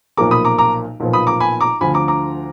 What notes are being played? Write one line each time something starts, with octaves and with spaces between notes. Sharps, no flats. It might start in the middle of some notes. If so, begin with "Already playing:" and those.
B1 A#2 F3 A#3 A#5 D6
B5 D#6
A#5 D6
A#5 D6
B1 A#2 F3 B3
B5 D#6
A#5 D6
G#5 B5
A#5 D6
D2 D3 F3 G#5 B5
A#5 D6
A#5 D6